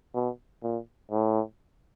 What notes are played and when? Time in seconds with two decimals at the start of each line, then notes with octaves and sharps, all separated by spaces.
0.14 B2
0.63 A#2
1.11 A2